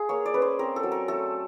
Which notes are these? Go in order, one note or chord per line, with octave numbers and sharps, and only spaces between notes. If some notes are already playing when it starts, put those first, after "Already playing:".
Already playing: F4 G#4
A#3 C#5
D5
C#4 B4
C5
C4 A#4
A4
F#3
A#4
A3 A4